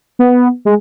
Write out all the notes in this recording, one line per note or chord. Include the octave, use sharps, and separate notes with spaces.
B3
G#3